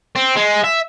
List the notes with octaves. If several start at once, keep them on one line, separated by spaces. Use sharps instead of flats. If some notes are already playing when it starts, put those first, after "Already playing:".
C4
G#3
E5